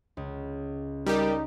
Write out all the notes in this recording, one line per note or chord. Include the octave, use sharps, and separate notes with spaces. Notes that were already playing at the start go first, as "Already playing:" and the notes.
C#2
G3 D#4 G4 A#4